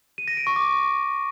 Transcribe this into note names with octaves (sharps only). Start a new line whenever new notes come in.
D#7
A#6
D7
C#6
D6